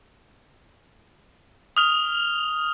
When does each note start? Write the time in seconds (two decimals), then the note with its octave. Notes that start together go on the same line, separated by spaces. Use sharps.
1.77 D#6 F6 F7